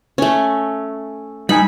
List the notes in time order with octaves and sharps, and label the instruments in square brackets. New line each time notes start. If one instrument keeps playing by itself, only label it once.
[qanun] A3 C#4
[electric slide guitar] G3 D#4 G#5 [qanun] B5